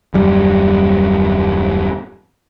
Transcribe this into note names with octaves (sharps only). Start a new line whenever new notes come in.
D#1 F#2 G3